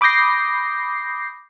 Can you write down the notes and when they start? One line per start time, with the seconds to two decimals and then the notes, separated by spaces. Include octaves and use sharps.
0.01 B5 D6 D#6 G6 A#6 C7